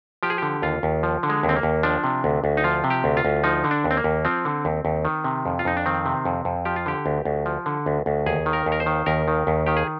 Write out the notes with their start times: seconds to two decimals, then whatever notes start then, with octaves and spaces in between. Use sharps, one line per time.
0.23 F3 G4
0.30 G#4
0.38 D3 G4
0.62 D#2 F4
0.83 D#2
1.03 F3
1.23 D3
1.29 G#3
1.43 D#2
1.49 C4
1.56 A#3
1.63 D#2
1.83 F3 D4
2.04 C3
2.24 D2
2.44 D2
2.57 D#4
2.64 F3 F4
2.84 C3
2.90 G4
3.04 D2
3.17 F4
3.25 D2
3.44 F3 D#4
3.64 D3
3.71 D4
3.84 D#2
3.91 C4
3.97 A#3
4.04 D#2
4.25 F3 C4
4.45 D3
4.65 D#2
4.85 D#2
5.05 D#3
5.24 C3
5.46 F2
5.59 F4
5.65 F2 D#4
5.77 D4
5.86 D#3 C4
6.06 C3
6.25 F2
6.45 F2
6.65 F3 G4
6.76 F4
6.86 D3 G4
7.06 D2
7.25 D2
7.46 F3
7.66 D3
7.86 D2
8.06 D2
8.26 D#2 G#4
8.46 D#3
8.53 A#4
8.66 D#2
8.72 A#4
8.80 C5
8.86 D#3
9.06 D#2 A#4
9.28 D#3
9.47 D#2
9.66 D#3 G4
9.77 G#4